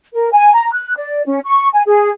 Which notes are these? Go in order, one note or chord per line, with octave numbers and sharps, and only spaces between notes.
A#4
G#5
A#5
F#6
D5
C#4
C#6
G#5
G#4